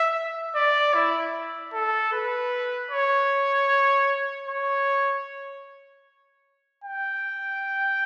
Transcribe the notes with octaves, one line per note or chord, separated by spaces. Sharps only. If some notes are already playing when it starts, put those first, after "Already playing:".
Already playing: E5
D5
E4
A4
B4
C#5
C#5
G5